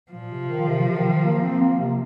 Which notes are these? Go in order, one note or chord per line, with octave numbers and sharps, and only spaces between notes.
A#2 F3
C3
D#3
C3
C3
D#3
A#3
C4
A#3
C3